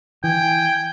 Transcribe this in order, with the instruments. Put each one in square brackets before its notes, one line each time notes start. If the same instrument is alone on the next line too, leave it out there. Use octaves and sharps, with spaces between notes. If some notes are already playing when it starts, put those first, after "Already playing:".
[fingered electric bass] E3 [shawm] G5 [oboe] G#5